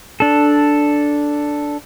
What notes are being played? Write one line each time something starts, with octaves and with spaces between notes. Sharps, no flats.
D4 A4